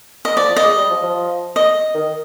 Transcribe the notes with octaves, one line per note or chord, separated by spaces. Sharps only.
D#5
F3 D5
F3
D#5
G#3
G3
F3
F3
D#5
D#3